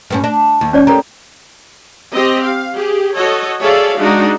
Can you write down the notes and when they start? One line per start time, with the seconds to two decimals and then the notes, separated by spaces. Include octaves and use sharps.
0.11 G2 B3 C#4
0.24 D4
0.61 D#2
0.73 C#4 C#5 D5
0.87 G4 A4 A#4 A#5
2.14 C4 G4 D#5
2.43 F5
2.74 G4 G#4
3.15 F#4 A4 C#5 D#5
3.60 G#4 A4 C#5 D5 E5 F5
3.99 G#3 D4 D#4 F#4